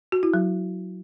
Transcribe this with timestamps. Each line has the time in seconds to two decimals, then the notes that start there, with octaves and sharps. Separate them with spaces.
0.12 F#4
0.23 E4
0.34 F#3